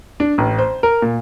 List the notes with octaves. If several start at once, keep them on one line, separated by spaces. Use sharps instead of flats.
D4
A1
C5
A#4
A#2